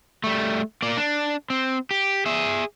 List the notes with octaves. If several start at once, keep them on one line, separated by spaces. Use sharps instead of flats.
G3 A3
A#3 D5
D4
C4
G4
G#4 E5